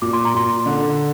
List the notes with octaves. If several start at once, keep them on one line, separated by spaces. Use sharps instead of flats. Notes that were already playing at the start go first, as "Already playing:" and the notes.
A#2 D6
C6
A#5
A#2 C6
D3